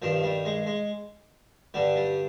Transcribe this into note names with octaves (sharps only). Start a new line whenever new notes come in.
G2 D#3 F3
G3
G#3
G#3
G2 D3 G3
G3